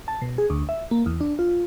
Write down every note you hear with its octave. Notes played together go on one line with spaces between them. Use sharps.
A5
B2
G#4
D2
E5
A#3
E2
D4
F4